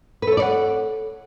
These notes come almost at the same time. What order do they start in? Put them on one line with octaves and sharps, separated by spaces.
B4 A4 C#5 D5 F#5